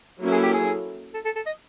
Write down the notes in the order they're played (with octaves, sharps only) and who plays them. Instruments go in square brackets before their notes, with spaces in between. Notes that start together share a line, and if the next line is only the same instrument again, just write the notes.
[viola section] F#3 A#3 C#4 E4 A4
[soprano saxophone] G#4
G4
G#4
A4
A4
A4
D#5